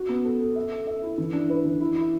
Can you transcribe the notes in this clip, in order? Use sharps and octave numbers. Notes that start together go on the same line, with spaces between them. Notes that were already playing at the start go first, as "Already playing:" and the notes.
Already playing: F#4
B3
A4
A4
E5
A4
E5
E4
E3
D4
B4
E3
E4
E4